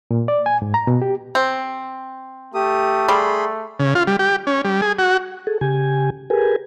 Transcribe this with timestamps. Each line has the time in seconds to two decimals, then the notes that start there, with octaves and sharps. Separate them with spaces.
0.11 A#2
0.28 D5
0.46 G#5
0.62 G#2
0.74 A#5
0.87 B2
1.02 G4
1.35 C4
2.54 A3 G4 D#6
3.08 G3 G#4 B5 C6
3.79 C#3
3.95 F4
4.07 G3
4.19 G4
4.47 C#4
4.65 G3
4.81 G#4
4.99 F#4
5.47 G#4 A4
5.61 C#3 G4 G#5
6.30 G4 G#4 A#4 B4 G#5